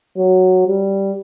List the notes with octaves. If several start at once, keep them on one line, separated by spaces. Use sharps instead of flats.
F#3
G3